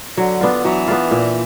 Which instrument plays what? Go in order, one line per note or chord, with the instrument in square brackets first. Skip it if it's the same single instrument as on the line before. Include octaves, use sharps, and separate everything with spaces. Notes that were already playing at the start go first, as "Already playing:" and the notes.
[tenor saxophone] D3 [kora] F#3
[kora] B3 D4 F4
[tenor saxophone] E3 [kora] F#3
[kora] B3 D4 F4
A#2